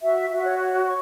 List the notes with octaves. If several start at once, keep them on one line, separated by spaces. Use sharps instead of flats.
F#4 E5
F#4
E5
C#5
C#5
C#5 C#6